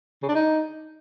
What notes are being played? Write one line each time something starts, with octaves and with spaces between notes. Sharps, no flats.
C#3
D4
D#4